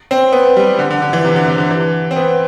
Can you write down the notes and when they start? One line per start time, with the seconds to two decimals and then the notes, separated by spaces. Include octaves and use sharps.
0.11 C4
0.32 B3
0.56 G3
0.79 D3
0.90 D3
1.02 D3
1.13 E3
1.25 C3
1.36 D3
1.47 C3
1.58 D3
1.71 E3
2.11 C4
2.16 B3